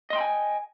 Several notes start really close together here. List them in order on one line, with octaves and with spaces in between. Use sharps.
D#5 C6 G5 B5 G#5